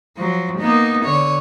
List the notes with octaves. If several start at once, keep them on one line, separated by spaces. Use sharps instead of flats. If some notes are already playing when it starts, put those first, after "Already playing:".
F3 F#3
A#3 B3 D#4
D3 C#5